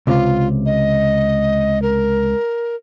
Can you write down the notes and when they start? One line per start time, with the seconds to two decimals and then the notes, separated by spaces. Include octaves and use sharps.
0.07 C#2 C3 F4
0.66 D#5
1.82 A#4